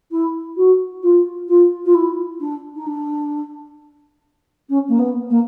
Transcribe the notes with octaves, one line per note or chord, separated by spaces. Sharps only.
E4
F#4
F4
F4
F4
E4
D4
D#4
D4
C#4
A#3
B3
A#3